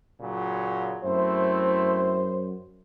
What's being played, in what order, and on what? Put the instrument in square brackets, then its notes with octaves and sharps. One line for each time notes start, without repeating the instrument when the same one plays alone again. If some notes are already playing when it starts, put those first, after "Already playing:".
[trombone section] A#2 C#3 F#3
[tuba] F#2 [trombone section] A3 C4 E4 [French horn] C5